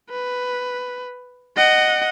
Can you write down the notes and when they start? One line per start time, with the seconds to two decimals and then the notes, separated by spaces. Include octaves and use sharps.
0.10 B4
1.57 D#5 F#5